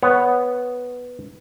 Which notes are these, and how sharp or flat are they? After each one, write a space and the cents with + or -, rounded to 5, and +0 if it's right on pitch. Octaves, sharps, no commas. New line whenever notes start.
B3 +0 C#5 -5